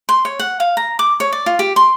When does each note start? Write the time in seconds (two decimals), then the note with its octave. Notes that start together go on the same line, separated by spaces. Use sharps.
0.09 C6
0.25 C#5
0.39 F#5
0.60 F5
0.77 A#5
0.99 D6
1.20 C#5
1.33 D5
1.46 F4
1.59 G4
1.76 C6